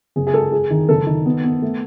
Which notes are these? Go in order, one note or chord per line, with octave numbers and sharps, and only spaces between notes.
F#1 G#4
G#4
G#3 A4
G#3 G#4
D#3
F#1 A4
D#3
B3
B3
A3